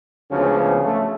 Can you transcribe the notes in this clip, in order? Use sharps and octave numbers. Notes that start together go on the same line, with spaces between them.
D2 C#3 F3 G#3 B3 C#4
A3